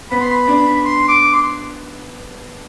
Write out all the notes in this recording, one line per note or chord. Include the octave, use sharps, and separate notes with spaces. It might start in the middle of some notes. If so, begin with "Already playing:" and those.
B3 B5
C6
B5
D4
C6
D6
C6